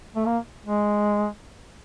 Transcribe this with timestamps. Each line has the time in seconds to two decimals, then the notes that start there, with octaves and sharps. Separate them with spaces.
0.16 A3
0.26 A#3
0.66 G#3